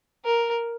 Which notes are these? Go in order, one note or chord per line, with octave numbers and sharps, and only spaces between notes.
A#4